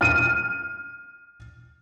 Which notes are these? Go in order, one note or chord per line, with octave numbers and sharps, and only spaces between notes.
F6 D#7